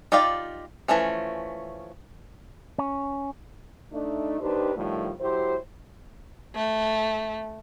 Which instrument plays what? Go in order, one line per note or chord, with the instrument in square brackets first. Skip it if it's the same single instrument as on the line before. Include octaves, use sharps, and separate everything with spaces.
[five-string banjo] D#4 F4 G4 D5 F5
E3 F3 A3 C#4
[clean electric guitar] C#4
[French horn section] A3 D4 D#4
D#2 D4 D#4 G4 B4 C5
A2 D3 D#3 F3 G3 A3
F#3 E4 G4 C5
[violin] A3